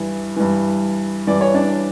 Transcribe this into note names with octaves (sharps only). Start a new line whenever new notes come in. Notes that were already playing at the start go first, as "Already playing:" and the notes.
Already playing: G2 E3
G2 E3
G2 E3 D5
C#5
D4 D5